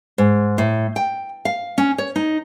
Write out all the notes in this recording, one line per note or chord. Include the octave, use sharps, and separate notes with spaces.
G#2
A2
G5
F5
C#4
C#5
D#4